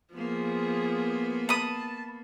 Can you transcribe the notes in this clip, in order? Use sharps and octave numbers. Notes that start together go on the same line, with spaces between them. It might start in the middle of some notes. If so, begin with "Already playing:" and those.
F3 A#3 B3 G#4
A5 B5 D#6